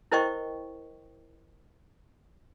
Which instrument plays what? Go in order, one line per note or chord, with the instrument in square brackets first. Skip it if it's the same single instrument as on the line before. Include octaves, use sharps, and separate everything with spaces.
[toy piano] E4 A#4 C5 D#5 G5 C#6